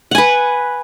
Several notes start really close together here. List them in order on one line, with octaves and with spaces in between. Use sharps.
F#5 G#5 B4